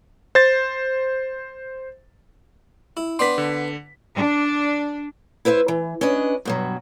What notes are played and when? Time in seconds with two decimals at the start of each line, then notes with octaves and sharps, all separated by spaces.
0.35 C5 A6
2.97 E4
3.19 B3 D4 G5 C6 B6
3.38 D3
4.17 D4
5.45 E4 B4 C5 D#5 E5
5.68 E3
6.01 C#4 D4 B4 D#5
6.45 G2 B2 F#3